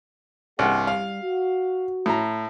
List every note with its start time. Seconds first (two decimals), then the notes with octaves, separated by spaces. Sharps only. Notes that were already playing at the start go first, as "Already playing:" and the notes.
0.59 C2 G2 A#3 G#4 F#5
0.87 G3 F5
1.23 F#4
2.06 A2 A#5